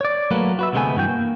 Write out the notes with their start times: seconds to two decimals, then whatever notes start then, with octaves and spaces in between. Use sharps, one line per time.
0.01 C#5 D5
0.31 F#3 A3 A#3 F#4 B4
0.59 F#4 B4 E5
0.73 D2 C3 G#3 A3 B3 G#5
0.96 G2 E3 F#4 G5
1.08 A#3